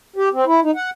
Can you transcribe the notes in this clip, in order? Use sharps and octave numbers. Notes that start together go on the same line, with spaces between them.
G4
C4
E4
D#4
F#5